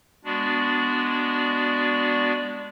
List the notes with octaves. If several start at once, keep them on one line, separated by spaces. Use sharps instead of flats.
G#3 B3 D4 F#4 D5